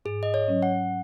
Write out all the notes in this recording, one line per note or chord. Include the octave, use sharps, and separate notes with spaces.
G#2 G#4
D#5
C#5
F#3 C#4
F#5